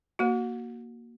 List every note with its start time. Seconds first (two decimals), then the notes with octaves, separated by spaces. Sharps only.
0.19 A#3 F#4